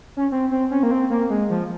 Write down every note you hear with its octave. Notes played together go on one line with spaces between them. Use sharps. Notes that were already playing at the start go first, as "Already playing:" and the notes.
C#4
C4
C4
C#4
A#3
C4
A#3
G#3
F3